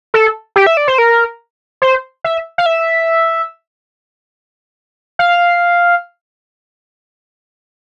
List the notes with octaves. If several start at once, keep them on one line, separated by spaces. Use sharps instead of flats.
A4
G4
E5
D5
C5
A#4
C5
E5
F5
E5
F5